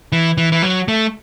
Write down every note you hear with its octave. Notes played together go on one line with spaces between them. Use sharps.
E3
E3
E3
F#3
A3